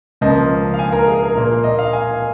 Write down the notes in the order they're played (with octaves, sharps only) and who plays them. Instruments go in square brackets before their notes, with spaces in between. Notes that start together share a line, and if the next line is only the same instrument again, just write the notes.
[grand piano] C#2 C#3 F3 A#3 D#5
F5
G#5
A#4
G#4
A#4
A#2 A#3
D#5
F5
G#5